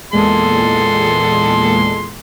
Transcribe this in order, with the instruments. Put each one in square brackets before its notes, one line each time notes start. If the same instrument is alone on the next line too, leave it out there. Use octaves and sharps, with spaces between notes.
[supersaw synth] E2 A#2 G#3 [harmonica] A4 C6